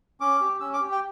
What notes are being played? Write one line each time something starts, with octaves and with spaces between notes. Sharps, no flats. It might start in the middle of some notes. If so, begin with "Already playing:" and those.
C#4 D6
G4
C#4 E6
D6
G4
G5